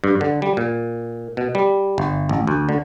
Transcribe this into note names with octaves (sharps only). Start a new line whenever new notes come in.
G2
D3
G3
A#2
B2
G3
G1
A1
D2
D3